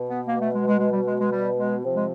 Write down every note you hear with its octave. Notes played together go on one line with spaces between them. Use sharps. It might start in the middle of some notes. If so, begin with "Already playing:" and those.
Already playing: B2
B3
A#3
A3
G#3
G#3
G#3
G3
G#3
G#3
G3
G#3
C3 F3
G#3